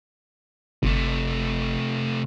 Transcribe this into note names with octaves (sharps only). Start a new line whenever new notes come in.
G1 C3 A3